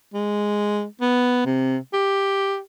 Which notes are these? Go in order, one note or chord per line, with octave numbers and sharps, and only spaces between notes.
G#3
B3
C3
G4